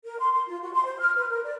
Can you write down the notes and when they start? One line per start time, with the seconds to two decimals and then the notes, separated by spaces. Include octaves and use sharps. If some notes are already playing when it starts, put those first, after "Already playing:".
0.05 A#4
0.19 C6
0.32 C6
0.47 F4
0.61 F#4
0.73 C6
0.84 C5
0.99 F6
1.16 B4
1.30 A#4
1.43 D5